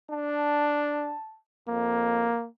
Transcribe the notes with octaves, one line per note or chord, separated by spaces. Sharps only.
D4 A5
F2 A#3